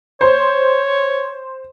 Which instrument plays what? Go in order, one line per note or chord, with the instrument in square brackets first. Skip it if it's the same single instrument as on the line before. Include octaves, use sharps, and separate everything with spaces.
[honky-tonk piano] C5 [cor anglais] C#5